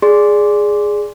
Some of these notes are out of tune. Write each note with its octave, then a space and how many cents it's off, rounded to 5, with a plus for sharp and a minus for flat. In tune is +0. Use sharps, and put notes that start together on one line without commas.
G#4 +0 D5 +0 C6 +0